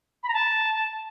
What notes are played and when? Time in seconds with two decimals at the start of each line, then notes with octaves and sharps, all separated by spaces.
0.23 B5
0.28 A#5
0.33 A5